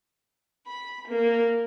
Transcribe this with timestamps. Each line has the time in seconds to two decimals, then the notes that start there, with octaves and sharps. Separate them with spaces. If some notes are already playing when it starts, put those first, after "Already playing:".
0.67 B5
1.08 A#3